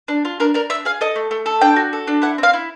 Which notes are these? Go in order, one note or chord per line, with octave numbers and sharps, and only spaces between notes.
D4
F4
D4 A#4
D4 A#4
D4 E5
G#4 F5
A4 D#5
A3
A3
A4
D4 G5
F#4
A4
D4
E4 F#5
C4 F5
E4